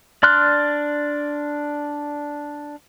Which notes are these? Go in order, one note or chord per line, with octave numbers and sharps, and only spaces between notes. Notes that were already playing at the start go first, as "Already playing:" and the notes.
D4 D5 C6 F6 F#6